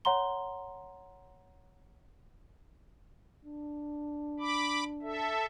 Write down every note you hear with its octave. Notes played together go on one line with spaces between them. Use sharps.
C#5 F#5 A#5 C6 G7
D4
B5 D6
A4 E5